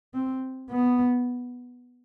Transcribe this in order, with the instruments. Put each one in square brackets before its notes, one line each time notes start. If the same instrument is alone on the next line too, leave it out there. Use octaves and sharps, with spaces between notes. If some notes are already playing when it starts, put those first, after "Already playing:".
[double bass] C4
B3